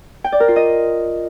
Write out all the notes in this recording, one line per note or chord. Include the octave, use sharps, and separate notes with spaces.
G5
D5
A#4
F4
D#5